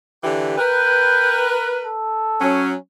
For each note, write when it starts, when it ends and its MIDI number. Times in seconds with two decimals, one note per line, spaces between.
0.24 0.56 50
0.24 0.56 52
0.24 0.56 67
0.58 1.93 70
0.58 1.93 71
0.58 1.47 79
1.85 2.63 69
2.41 2.73 54
2.41 2.73 61